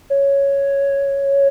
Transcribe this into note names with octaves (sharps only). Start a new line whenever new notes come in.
C#5